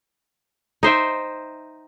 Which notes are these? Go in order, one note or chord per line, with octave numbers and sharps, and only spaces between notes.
D#4 C5 E5 G5